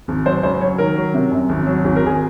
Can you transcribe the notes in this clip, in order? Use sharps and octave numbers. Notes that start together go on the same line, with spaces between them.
G#1
F#3 C5
C#2 C5
F#3 C#5
D#3 A#4
F#3
C3
F#2
G#1
F#3
G#1 G#4
A#4
G#1 G#4